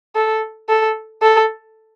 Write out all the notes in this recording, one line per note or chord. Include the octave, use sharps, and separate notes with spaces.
A4
A4
A4